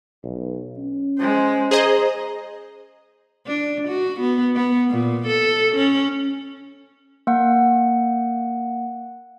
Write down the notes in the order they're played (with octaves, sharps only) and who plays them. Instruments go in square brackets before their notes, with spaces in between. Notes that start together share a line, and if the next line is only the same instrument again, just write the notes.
[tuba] B1
C#4
[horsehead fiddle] G#3 C5
[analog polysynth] G#4 C5 D#5 [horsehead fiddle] A#5
[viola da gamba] D4
F#4
B3
B3
A#2
A4
C#4
[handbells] A#3 F#5